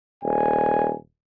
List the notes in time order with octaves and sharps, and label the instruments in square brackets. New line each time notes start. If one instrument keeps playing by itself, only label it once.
[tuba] D#1 [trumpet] G#5